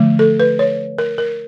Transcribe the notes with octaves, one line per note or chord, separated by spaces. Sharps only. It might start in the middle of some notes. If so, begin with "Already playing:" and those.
Already playing: D3 F3 A3
A4
B4
C#5
A#4
A#4